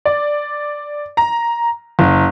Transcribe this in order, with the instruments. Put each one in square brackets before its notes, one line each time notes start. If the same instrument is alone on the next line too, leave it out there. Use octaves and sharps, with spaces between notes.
[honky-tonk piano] D5
A#5
F#1